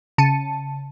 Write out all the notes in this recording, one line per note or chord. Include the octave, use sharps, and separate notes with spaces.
C#3 A5 C#7 D#7